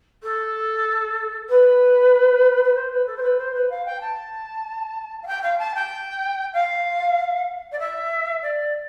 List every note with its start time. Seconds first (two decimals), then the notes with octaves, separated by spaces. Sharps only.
0.22 A4
1.49 B4
2.64 B4
2.75 C5
2.91 B4
3.06 A4
3.17 C5
3.22 B4
3.37 C5
3.54 B4
3.69 F5
3.85 G5
4.00 A5
5.22 F5
5.27 G5
5.42 F5
5.58 A5
5.74 G5
6.53 F5
7.71 D5
7.79 E5
8.42 D5